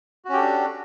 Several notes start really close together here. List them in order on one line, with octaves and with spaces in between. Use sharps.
F#4 C#4 G4 A4 D4